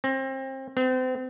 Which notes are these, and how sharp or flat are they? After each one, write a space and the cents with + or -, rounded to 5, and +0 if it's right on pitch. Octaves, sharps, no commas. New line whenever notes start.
C4 +30
C4 -35